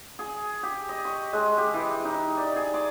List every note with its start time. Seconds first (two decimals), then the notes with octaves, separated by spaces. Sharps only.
0.19 G#4
0.63 G4
0.89 D#5
1.05 C#6
1.33 G#3
1.58 G4
1.74 E3
2.05 D#4
2.37 D5
2.56 G#4
2.74 D6